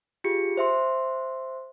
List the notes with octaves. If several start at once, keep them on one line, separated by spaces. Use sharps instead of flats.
F4 G4 G#4 C#7
C5 E5 C6